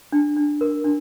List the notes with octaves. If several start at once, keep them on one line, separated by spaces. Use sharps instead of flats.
D4
D4
A#4
D4